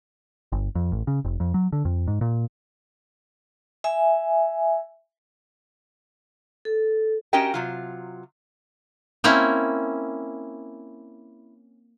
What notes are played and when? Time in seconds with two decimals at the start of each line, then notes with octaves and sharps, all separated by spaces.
0.52 G1
0.75 F2
0.92 A1
1.07 C#3
1.25 F1
1.40 F2
1.54 F#3
1.72 D3
1.85 F2
2.07 G#2
2.21 A#2
3.84 E5 G#5
6.65 A4
7.33 C#4 F#4 G4 A#4 D#5 G5
7.54 C3 F#3 F4
9.24 A#3 C4 C#4 E4